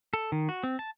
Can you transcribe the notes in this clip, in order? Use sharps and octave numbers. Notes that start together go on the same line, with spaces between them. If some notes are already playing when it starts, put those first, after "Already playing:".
A4
D#3
F#4
C4
A5